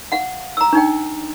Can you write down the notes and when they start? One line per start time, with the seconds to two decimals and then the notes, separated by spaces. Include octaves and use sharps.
0.12 F5 F#5
0.57 A#5 E6
0.73 D4 D#4 G5